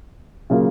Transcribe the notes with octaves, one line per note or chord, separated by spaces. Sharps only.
C#3 F#3 A#3 F4